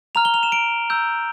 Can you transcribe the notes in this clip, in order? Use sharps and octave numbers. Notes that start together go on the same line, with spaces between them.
A#5 F6 F7
G7
F7
E7
D7
A#5 E6 G6